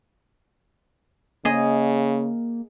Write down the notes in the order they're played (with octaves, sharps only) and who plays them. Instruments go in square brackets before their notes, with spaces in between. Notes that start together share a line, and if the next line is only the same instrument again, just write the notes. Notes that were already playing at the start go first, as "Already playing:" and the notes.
[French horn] C#3 [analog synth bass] A#3 [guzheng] G#4 D#5